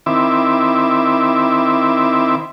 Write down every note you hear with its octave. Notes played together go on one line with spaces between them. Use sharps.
D#3 C4 E4 E5 D6